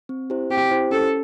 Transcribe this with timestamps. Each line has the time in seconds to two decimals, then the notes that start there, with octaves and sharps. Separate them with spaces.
0.09 C4
0.30 E4 G4 C5
0.51 C4 G4
0.71 E4 G4 C5
0.91 C#4 A4